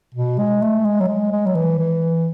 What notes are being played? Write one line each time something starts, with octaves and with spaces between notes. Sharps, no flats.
B2
G#3
A3
G#3
F#3
G#3
G#3
F#3
E3
E3